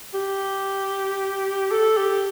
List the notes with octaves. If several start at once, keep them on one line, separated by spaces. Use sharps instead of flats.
G4
A4
G4